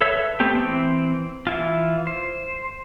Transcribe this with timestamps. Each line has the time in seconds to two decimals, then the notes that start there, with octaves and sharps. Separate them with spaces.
0.01 A4 B4 C#5 E5 E6
0.40 A3 B3 C4 G4
0.55 E3 C4
1.47 E3 E4 F4
2.07 C5